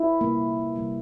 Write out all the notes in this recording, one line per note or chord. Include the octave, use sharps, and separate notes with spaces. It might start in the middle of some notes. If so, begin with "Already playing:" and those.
Already playing: E4
C3 G3 A#3
C3 G3 A#3